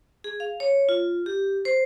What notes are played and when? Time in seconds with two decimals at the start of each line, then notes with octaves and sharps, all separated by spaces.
0.24 G#4
0.40 F5
0.60 C#5
0.89 F4
1.26 G4
1.65 C5